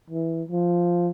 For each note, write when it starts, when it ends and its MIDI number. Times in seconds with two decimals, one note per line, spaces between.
0.10 0.43 52
0.49 1.10 53